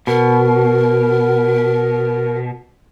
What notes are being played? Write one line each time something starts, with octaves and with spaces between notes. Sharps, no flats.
B2 A#4